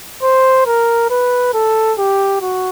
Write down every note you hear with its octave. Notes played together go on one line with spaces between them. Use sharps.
C5
A#4
B4
A4
G4
F#4